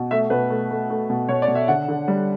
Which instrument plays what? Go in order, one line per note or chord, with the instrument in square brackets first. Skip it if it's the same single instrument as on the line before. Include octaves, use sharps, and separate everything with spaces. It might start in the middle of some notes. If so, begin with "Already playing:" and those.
Already playing: [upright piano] B2
A3 E5
B2 B4
A3
A3
A3
B2
B2 C#5
D5
B2
E5
D3 F#5
D3
G3